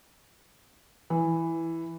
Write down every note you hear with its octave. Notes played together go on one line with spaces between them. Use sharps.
E3